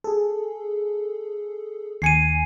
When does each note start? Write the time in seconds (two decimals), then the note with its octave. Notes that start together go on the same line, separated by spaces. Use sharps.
0.04 G#4 A4
2.02 D#2 G#5 C7 C#7 D#7